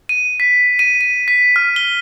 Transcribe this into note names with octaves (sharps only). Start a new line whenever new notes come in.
D#7
B6
D#7
D#7
B6
F6
G7